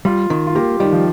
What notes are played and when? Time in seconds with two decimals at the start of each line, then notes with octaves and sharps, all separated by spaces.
0.05 G3 F4
0.30 D#3
0.47 F4
0.55 A#3 G4
0.80 D#3 G3
0.93 F3